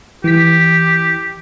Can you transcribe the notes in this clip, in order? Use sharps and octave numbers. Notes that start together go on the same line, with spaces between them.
E3 G4 B6